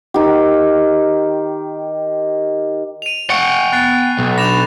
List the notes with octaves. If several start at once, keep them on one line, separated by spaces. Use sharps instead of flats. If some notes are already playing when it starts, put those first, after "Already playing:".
D#3 G4
D#7 F7
F#5 G5 C#6
B3 F#6 A6 C7
B1
D4 B5 A#6 E7 F7